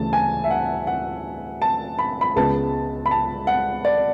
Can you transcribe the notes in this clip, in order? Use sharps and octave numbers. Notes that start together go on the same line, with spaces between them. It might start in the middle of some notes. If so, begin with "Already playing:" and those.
Already playing: D2 C#3 E3 A3 A5
G#5
E5
F#5
F#5
A5
B5
B5
C#2 C#3 G#3 B3 A5
B5
A5
F#5
D5